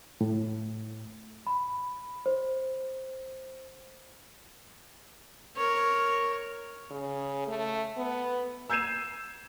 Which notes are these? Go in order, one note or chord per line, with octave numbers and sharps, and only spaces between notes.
A2
B5
C5
A#4 C#5
C#3
A3
B3
E6 G6 G#6 C7 D#7 E7